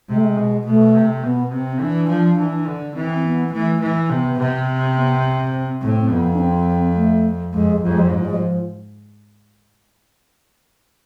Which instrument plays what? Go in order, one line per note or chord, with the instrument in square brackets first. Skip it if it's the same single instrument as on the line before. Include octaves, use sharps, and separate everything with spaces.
[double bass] C3 [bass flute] G#3
[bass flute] A3
G#3
[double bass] B2
[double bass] B2 [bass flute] A3
[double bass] C3
[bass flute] A3
[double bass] B2 [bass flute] B3
[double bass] C3 [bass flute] C4
[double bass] E3 [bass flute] D4
[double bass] F3
E3
D3
[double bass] E3 [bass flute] C4
[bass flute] B3
[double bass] E3 [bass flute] A3
[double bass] E3
[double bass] C3 [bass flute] B3
[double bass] C3
[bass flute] C4
B3
C4
[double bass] A2 [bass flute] C4
[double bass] F2 [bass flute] B3
[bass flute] D4
C4
A3
[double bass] F2 [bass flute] G#3
[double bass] F2 [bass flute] F3
[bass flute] G#3
F3
[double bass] G#2 [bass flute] G#3
[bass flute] F3
G#3
F3